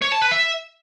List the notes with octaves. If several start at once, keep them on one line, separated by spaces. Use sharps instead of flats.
C#5
A5
B4
E5